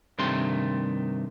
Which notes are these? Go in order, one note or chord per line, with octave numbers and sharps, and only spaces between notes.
G2 C3 D#3 A3 C6